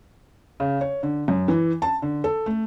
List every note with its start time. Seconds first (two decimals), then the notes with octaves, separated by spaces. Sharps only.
0.60 C#3
0.81 C#5
1.03 D3
1.28 F#2
1.48 E3
1.82 A5
2.02 D3
2.24 A4
2.46 A3